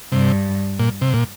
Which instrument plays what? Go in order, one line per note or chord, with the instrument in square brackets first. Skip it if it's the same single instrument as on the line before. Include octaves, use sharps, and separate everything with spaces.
[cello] G2 [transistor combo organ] C3
[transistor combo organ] A#2
C3
A#2